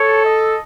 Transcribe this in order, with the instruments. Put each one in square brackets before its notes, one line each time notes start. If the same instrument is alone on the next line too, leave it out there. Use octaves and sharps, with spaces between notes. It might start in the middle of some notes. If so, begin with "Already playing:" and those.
Already playing: [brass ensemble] A4 [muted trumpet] C#5
[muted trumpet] D#5